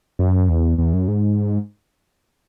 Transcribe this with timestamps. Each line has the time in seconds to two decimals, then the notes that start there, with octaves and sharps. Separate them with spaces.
0.19 F#2
0.49 E2
0.78 E2
0.93 F#2
1.08 G#2